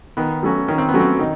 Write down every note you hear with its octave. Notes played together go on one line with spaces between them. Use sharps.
D#3 B3
F#3 A3 C#4 F#4
D#3 C#4
C4
B3
F#3 A3 C#4 F#4
C4
D#3 D#4